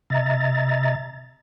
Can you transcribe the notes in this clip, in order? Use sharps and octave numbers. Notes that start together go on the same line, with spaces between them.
C3 D#5 E5 A#5 A6